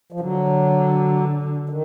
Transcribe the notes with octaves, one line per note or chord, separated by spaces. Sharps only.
F3
D3 F#3
D#3